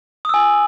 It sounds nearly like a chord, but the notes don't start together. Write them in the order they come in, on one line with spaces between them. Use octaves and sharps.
D#6 E6 G#5